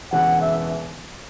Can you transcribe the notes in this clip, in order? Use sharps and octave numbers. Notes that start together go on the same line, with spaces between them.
E1 E2 C#3 E3 B3 F#5
E5